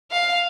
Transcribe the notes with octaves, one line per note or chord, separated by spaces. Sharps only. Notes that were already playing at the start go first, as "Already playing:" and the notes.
F5